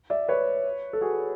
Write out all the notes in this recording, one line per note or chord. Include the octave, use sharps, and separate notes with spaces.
D5 E5
B4 C#5
A4
F#4 G#4